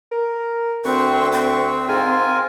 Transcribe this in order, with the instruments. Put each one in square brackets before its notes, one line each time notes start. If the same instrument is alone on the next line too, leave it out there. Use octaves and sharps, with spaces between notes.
[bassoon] A#4
[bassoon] D2 [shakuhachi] C4 [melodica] B4 C#6
[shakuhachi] C4
[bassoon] G#2 [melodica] F4 A#4 G#5